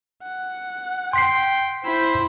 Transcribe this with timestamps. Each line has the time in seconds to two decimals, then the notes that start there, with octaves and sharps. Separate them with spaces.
0.23 F#5
1.13 G5 C6 B6 C7
1.85 E4 C5 B5